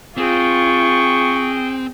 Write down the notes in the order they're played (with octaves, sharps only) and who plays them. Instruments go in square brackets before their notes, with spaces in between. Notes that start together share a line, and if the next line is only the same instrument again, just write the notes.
[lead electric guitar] C4 [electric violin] F4 [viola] G#4 G5 [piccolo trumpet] C#6